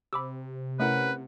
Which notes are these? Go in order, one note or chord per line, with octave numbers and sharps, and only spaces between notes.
C3 B5 D6 E6
A3 C#4 E4 A#4 B4 F#5